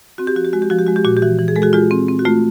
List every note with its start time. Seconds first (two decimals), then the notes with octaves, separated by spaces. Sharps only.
0.18 C4 F#4
0.27 G4
0.35 F3 F#4
0.45 G4
0.53 G#3 F#4
0.62 G4
0.70 F3 F#4
0.79 G4
0.87 G#3 F#4
0.96 G4
1.05 A#2 F#4
1.17 G4
1.22 E3 F#4
1.39 E3
1.48 G#4
1.56 G#3 A4
1.62 F#4 G#4
1.73 G#3 F4 G4
1.91 C4
2.08 C4
2.19 F#4
2.25 A3 F4